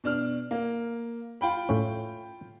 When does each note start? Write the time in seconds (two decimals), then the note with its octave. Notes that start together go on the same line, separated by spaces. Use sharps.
0.04 B2 D4 F6
0.51 A#3
1.41 F4 G5 B5
1.69 A2 C#4